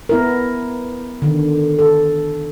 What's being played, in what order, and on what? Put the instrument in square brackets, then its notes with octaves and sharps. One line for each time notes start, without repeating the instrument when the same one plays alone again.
[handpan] B3 E4 A#4
D3 D#3
A4